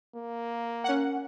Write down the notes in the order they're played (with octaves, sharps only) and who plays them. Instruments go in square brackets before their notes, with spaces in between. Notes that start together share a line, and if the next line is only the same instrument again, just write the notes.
[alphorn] A#3
[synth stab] C#4 F#5